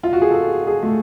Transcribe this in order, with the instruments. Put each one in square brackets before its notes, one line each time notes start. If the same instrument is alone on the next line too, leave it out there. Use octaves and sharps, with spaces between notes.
[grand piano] F4
F#4
G#4
A4
G#4
A3